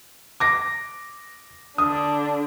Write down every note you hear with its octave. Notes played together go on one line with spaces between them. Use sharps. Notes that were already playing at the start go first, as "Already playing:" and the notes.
D6 A#6
D3 D4 D#6